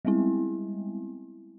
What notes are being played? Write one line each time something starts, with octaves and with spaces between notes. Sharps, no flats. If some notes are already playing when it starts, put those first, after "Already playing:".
G3 G#3 B3 C4 E4